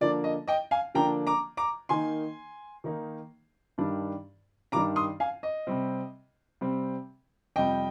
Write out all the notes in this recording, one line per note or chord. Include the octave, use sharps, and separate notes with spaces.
D3 F3 A#3 D4 D5
D#5
D#5 G5
F5 G#5
D3 F3 A#3 D4 G5 A#5
A#5 D6
A#5 D6
D#3 A#3 D#4 G#5 C6
D#3 A#3 D#4
G2 D#3 G3 D4
G2 D#3 G3 D4 A#5 D6
C6 D#6
F5 G#5
D#5
C3 G3 C4
C3 G3 C4
F2 C3 G3 D#5 G5